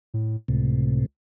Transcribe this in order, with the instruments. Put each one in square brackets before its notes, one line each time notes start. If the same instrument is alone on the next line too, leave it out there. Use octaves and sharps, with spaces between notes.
[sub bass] A2
[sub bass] C#2 [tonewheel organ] A2 C3